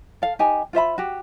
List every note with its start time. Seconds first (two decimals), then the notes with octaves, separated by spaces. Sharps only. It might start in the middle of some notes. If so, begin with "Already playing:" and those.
0.22 A4 F5
0.39 D#4 G4 G#5
0.73 F4 C5 E5 B5
0.98 F#4 G4